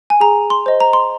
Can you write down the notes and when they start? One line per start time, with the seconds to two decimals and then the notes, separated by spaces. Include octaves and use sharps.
0.10 G#5
0.20 G#4 A#5
0.50 C6
0.66 C5 D#5
0.80 A#5
0.93 C6